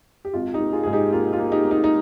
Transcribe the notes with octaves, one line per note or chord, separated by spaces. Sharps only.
G4
G#1 F4
D#4 G4
A#3
F4 G#4
G#2 G#4
D#4 G4
A#3 F4
F4
A#3
D#4 G4
A#3
D#4
D#4